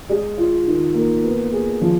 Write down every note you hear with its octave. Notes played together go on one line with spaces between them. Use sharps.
G#3
F4
D#3
A#3
B3
G#4
F3